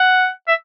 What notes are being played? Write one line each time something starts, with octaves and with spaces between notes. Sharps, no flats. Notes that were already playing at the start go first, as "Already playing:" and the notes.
Already playing: F#5
E5